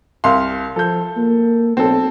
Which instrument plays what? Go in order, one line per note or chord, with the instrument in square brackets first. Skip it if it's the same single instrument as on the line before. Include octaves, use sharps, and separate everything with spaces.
[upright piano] C2 F5 C6
[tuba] F3 [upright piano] A4 G6
[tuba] A#3
[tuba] B1 [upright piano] C4 A4